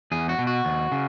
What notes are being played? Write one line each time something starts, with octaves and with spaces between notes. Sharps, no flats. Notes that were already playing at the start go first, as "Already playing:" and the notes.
E2 G#4
F#4
B2
F#4
D#2
C#3